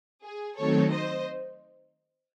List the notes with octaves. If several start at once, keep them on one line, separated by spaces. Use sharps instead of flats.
G#4
D#3 F#3 A3 C4 D#4 A4 C#5
C5 D#5